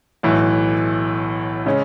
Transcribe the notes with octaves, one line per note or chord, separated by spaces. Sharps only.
B1 A2 E3
C#3 G#3 C#4